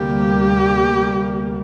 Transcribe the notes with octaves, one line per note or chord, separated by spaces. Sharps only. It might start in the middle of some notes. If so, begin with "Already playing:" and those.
Already playing: D2 C3 G3 A#3 G4